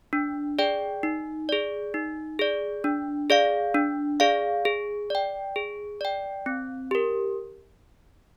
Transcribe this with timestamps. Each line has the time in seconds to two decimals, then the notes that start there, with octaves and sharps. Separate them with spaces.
0.13 D4
0.59 G#4 D5 G5
1.03 D#4
1.49 G#4 D5
1.94 D#4
2.39 G#4 D5
2.84 D4
3.30 G#4 D5 F5
3.75 D4
4.20 G#4 D5 F5
4.65 G#4
5.10 D5 G5
5.56 G#4
6.01 D5 G5
6.46 C4
6.91 G4 A#4